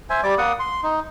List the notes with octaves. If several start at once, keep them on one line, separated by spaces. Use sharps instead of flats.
C5 E5 G#5
G3 D5 D6
A#3 F#5 D#6
C6
D#4